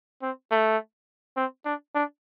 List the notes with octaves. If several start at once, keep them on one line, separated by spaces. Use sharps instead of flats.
C4
A3
C4
D4
D4